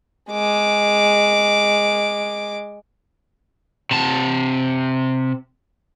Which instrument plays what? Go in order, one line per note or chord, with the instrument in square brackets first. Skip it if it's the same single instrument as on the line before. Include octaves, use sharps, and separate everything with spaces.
[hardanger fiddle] G#3 D6
[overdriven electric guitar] C3 A5